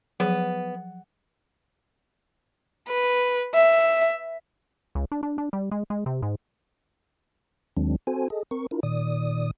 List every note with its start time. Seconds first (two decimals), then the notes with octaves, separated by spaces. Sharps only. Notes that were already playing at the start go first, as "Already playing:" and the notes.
0.20 F3 F#3 B3 G#4
2.89 B4
3.55 E5
4.95 C#2
5.12 D4
5.23 D4
5.38 D4
5.53 G3
5.71 G#3
5.90 G#3
6.06 C3
6.22 G#2
7.77 D#2 D#3 F#3 G#3 C4 D4
8.07 C4 F#4 A4 C5 G#5
8.30 G#4 A4 D#5
8.51 C4 A#4 C#6
8.71 D4 E4 F4 A#4
8.83 A#2 D#3 D5 D#6